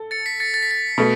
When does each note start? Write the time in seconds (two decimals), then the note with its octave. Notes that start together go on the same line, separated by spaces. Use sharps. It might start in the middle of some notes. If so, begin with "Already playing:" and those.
Already playing: A4
0.11 A6 C#7
0.26 B6
0.40 A6 C#7
0.54 A6
0.62 B6
0.71 A6
0.98 B2 A3